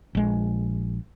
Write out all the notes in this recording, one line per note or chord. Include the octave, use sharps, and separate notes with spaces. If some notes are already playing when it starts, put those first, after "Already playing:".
A#1 G#3